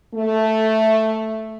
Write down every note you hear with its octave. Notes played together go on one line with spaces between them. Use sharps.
A3